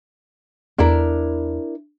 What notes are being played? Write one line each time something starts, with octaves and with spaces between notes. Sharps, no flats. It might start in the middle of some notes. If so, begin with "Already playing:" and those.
E2 D4 E4 A#4